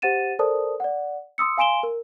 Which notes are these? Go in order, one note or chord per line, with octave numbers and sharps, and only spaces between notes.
G4 C5 F#5 A6 D#7 E7
A4 A#4 C5 D5 A5 D#6
D5 F#5
C6 D#6 E6 C#7
F5 G#5 C6 D7 E7 G7
A#4